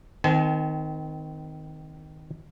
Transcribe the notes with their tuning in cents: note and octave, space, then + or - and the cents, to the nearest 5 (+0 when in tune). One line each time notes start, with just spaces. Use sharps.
D#3 +0 C4 -30 G#5 +45